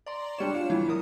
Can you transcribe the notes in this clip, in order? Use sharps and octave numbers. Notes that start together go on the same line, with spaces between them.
D5 A#5 C6
G3 D4 C#5 C#7 E7
F4
E3 G3
F#3 A#4 D#6